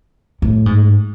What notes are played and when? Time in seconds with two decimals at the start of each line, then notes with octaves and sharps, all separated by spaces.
0.42 A2
0.66 G#2